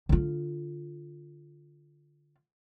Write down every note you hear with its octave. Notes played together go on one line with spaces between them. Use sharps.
D3 F4